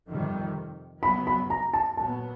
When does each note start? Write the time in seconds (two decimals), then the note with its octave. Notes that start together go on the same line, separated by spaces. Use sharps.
0.09 F2 C3 D#3 G3
1.03 C#3 F#3 B3 B5
1.27 B5
1.50 A#5
1.74 A5
1.97 A#2 F#3 B3 A5